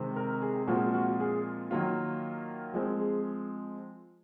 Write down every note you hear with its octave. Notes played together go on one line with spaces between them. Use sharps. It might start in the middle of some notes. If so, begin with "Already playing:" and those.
Already playing: C3 D#3 G#3 C4
A#4
G#4
A#2 F3 G#3 C4 F4 F#4
F#4
G#4
D#3 F#3 A#3 F4
F3 G#3 C4
G#4